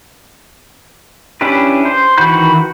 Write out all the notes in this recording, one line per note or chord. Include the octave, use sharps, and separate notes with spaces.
C#4 D4 E4 G4 B4
C5
D#3 E3 F#4 B5 G6